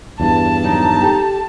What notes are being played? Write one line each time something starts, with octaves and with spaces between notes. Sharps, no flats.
E2 G2 A5
A#2 D#3 F#3 D#4
G4 A4